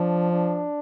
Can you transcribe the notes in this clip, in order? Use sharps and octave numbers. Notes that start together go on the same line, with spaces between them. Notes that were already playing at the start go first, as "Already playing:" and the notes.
Already playing: F3 D4
D4